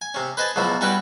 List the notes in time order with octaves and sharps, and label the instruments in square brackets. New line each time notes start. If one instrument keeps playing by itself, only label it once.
[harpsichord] G#5
C3 C#4
B4 C5 D#5 G#5 A5
C#2 B2 F3 F#3 E4
G3 C#4 E4 F#4 B4 G5